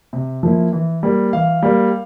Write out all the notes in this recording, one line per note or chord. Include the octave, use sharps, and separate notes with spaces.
C3
F3 A#3 E4
E3
G3 A#3
E3 F5
G3 A#3